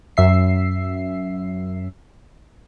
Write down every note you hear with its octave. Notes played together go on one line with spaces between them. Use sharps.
F#2 E5 C7